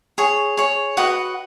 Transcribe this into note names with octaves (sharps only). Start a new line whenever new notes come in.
G#4 C#5
G#4 C#5
F#4 B4 D#5 F#5